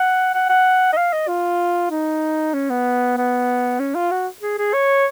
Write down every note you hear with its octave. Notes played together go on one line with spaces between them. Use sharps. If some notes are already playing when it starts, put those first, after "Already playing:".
Already playing: F#5
F#5
F#5
D#5
F5
D#5
F4
D#4
C#4
B3
B3
C#4
F4
F#4
G#4
G#4
C#5